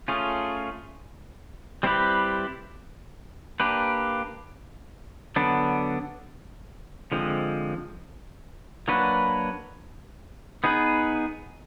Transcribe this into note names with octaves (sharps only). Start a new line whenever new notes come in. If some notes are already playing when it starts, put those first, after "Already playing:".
A3 C#4 F4 G#4
G3 C4 E4 G4 B4
A#3 D4 G4 B4
D3 F#3 B3 D4
D3 F3 G#3 C4
F#3 A#3 D4 F#4 B4
B3 D#4 G#4 B4